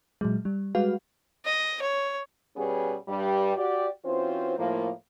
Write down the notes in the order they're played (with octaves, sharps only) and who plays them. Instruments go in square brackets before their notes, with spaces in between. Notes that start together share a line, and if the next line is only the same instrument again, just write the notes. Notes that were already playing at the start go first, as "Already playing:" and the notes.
[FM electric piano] A#2 F#3 G#3
G3
G3 G#3 F#4 B4 F5
[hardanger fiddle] D#5
C#5
[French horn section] B2 G3 B3 C#4 G#4
G2 G3
F#4 G4 D5
E3 C4 C#4 F4 F#4 C5
A2 F3 A#3